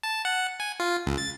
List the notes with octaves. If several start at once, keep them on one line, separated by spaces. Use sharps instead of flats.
A5
F#5
G#5
F4
C#2
A6